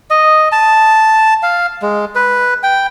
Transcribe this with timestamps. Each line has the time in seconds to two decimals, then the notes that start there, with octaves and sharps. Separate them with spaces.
0.10 D#5
0.52 A5
1.43 F5
1.82 G#3
2.15 B4
2.63 G5